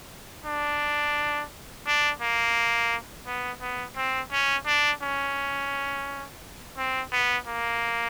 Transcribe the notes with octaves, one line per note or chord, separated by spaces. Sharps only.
D4
D4
A#3
B3
B3
C4
C#4
D4
C#4
C4
B3
A#3